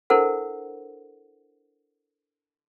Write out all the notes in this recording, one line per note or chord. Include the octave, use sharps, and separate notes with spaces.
D4 E4 A4 A#4 C5 F#5